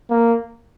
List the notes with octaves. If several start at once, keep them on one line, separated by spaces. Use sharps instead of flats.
A#3